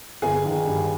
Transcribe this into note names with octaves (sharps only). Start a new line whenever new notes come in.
G1 G#4
D#3
G2